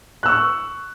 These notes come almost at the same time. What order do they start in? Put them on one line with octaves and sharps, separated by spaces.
F#6 E6 C#6